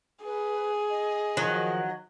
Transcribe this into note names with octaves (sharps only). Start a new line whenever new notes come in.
G#4 B4
D#5
D#3 F3 F#3